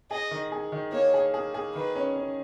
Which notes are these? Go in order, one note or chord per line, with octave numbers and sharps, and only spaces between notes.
G#4 D#5
D#3
G#4
D#3
A#3 C#5
G#4
G#4
G#4
D#3 B4
C#4
C#4